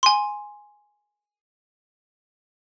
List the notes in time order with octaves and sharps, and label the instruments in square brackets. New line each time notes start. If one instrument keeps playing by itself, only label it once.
[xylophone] G#5 C6